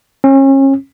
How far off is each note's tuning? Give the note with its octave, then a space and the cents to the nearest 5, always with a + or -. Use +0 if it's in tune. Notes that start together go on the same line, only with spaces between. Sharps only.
C#4 -35